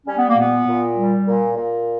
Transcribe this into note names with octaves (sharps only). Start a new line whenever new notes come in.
G3 C#4
B3
A#3
A#2 B3
A#2
G3
A#2
A#2